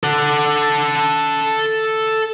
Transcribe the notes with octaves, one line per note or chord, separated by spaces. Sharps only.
A4 F#5